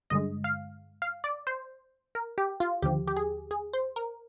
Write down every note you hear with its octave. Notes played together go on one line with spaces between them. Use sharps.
G2 D3 G#3 D#5
F5
F5
D5
C5
A#4
G4
F4
D#2 D3 F3 G4
G4
G#4
G#4
C5
A#4